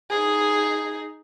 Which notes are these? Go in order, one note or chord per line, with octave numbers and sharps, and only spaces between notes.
D#4 G#4